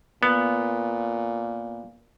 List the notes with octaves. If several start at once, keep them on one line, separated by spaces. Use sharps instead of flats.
A#2 B3